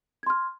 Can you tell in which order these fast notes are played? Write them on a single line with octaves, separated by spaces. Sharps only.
G#6 C6 F6